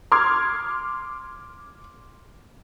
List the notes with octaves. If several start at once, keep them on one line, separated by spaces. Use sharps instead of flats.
C6 D6 F6 G#6